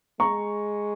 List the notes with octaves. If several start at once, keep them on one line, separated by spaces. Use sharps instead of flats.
G#3 A#5 C#6